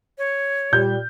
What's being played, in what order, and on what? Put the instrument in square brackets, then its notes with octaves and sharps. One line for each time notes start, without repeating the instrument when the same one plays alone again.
[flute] C#5
[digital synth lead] A#2 [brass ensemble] G3 [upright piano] G6